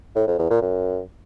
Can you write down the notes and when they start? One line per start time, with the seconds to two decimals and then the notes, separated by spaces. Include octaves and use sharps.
0.16 A2
0.27 F2
0.39 E2
0.50 A#2
0.62 F#2